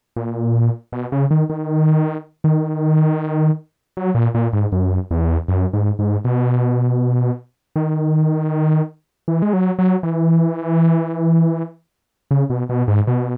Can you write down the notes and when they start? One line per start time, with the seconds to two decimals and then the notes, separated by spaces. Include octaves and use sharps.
0.16 A#2
0.92 B2
1.12 C#3
1.31 D#3
1.50 D#3
2.44 D#3
3.97 F#3
4.15 A#2
4.35 A#2
4.53 G#2
4.72 F#2
5.11 E2
5.48 F#2
5.73 G#2
5.99 G#2
6.25 B2
7.76 D#3
9.28 E3
9.42 G#3
9.53 F#3
9.79 F#3
10.03 E3
12.31 C#3
12.50 B2
12.69 B2
12.88 G#2
13.07 B2